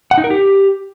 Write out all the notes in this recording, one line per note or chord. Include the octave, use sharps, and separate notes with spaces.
F#5
D#4
A#4
G4